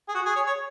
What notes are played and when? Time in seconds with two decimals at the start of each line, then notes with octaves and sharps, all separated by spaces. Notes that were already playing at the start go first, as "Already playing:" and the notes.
0.08 G#4
0.14 F#4
0.25 G#4
0.35 C#5
0.46 C#5